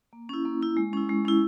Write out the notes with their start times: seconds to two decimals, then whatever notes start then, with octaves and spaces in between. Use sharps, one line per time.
0.13 A#3
0.29 C#4 E4
0.45 A#3
0.61 C#4 E4
0.77 G#3
0.93 C#4 E4
1.09 G#3
1.25 C#4 E4